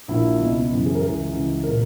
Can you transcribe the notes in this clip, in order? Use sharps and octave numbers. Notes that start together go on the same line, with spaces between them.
A#1 A#2 E4
C#2 B2
F#1 F#2 C#3 E3
G#4
A#4
C#2 C#3 E3 G#4
C#2 C#3 E3
A#2 A#4